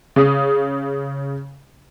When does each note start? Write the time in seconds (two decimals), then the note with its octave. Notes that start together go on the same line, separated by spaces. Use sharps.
0.16 C#3 D#6